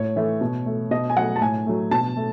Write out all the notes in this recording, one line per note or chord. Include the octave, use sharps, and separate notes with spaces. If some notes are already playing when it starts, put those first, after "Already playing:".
Already playing: A2 C#5
E3 A3
B2
A3
B2 D#5
G#5
F#3 A3 F#5
A5
A2 G#5
F#3 A3
B2 A5
A3